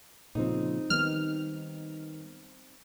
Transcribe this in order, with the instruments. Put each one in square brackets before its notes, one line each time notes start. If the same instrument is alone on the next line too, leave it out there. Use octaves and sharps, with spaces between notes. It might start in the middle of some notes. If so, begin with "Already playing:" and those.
[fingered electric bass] A#2 C#3 F3 [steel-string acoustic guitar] C4 D#4
[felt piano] D#3 [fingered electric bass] G3 B3 [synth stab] F6